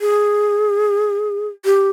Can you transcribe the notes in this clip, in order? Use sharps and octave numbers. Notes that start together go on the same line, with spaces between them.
G#4
G4